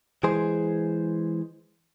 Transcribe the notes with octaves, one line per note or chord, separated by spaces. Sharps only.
E3 G#3 G#4 C5